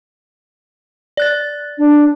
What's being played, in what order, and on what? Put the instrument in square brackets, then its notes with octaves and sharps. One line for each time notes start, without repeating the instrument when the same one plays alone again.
[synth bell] D5 F#6 A6
[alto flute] D4